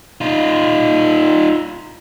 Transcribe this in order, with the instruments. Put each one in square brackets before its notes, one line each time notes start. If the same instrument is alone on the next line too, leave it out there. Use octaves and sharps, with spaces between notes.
[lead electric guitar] D#4 F4